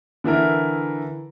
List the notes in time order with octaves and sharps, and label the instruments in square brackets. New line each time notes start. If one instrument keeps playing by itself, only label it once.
[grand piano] D3 E3 E4 A#4